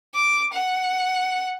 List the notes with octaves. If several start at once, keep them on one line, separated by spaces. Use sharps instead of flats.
D6
F#5